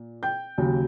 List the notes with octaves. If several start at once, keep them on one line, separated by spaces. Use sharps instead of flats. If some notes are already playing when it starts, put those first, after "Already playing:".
Already playing: A#2
G5 G6
D#2 C#3 F#3